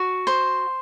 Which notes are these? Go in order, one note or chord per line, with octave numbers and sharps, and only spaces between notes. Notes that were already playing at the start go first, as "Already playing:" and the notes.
Already playing: F#4
C5